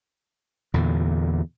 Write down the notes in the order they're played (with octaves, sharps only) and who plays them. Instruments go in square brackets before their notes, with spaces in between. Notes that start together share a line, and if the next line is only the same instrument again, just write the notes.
[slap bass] E2 A#2 D3